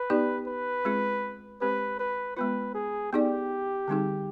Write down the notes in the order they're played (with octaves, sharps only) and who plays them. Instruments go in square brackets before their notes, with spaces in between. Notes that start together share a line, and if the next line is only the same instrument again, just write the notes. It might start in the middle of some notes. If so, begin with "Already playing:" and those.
Already playing: [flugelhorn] B4
[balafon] B3 D#4 G4 D5
[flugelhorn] B4
[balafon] G#3 C4 F4 G#4
[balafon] G#3 C4 G4 C5 [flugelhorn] B4
[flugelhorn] B4
[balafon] G#3 B3 F4 [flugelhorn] B4
[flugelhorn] G#4
[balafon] B3 D#4 G#4 D5 [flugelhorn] G4
[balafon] D3 G3 C4 D#4 G#4